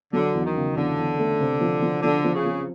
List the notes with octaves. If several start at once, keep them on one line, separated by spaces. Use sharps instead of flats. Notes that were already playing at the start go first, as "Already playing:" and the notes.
D3 F#3
E2
D#3
C#3
E2 D3
E2
A3
C3
F3
F3
D3 F3
F3
C#3
F3